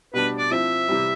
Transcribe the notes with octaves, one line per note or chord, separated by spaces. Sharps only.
B2 G3 D4 B4
D5
F3 C4 E4 E5
C3 E3 G3